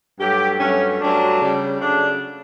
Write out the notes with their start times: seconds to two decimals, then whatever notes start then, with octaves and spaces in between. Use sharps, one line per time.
0.20 G2 F#3 A3 G4
0.60 G2 F#3 A3 C#4
1.00 G2 F#3 A3 D4
1.41 C#3 G3
1.80 C#3 F#3 A3 D4